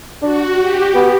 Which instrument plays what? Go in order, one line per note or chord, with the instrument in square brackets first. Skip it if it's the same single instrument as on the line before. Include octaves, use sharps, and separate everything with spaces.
[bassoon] D4 [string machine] F#4
[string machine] G4
[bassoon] B3